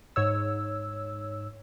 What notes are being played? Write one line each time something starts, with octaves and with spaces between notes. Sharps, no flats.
G#2 C#5 E6